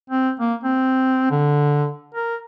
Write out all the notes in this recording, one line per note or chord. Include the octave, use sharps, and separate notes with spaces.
C4
A#3
C4
D3
A#4